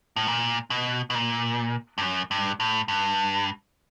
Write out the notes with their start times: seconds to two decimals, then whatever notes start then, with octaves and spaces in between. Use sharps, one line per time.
0.16 A2
0.27 A#2
0.70 B2
1.10 B2
1.15 A#2
1.98 G2
2.01 F#2
2.31 G2
2.60 A2
2.88 G2